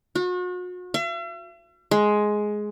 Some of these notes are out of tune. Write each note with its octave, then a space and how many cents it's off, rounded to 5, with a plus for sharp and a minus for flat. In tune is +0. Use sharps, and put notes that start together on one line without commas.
F#4 -40
E5 +45
G#3 +10